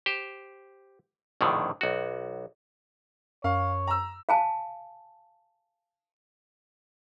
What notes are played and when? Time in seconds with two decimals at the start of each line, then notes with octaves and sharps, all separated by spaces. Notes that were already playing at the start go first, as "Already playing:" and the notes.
0.06 G4 C5
1.41 A#1 F2 A2 D3 D#3
1.81 B1 F#4
3.44 F#2 C#5 F5
3.87 A#5 E6
4.29 F5 G#5 A5